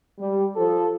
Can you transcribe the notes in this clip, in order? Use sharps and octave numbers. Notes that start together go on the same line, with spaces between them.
G3
F3 A4